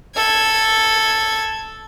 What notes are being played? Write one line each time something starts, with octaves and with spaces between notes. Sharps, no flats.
A4 G#6